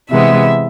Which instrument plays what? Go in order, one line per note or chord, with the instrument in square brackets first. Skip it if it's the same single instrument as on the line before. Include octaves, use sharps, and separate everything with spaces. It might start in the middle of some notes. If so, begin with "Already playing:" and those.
[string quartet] C3 E3 G#3 B3 E5